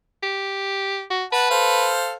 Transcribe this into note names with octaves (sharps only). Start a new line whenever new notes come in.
G4
F#4
B4 F#5 A5
A4 C5 F5